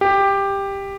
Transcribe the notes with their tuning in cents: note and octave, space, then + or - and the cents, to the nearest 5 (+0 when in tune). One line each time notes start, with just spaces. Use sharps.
G4 +10